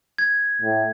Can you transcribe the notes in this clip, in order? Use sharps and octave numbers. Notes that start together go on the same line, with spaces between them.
G#6
A2